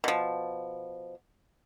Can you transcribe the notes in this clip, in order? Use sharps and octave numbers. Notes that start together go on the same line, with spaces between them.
B2 F3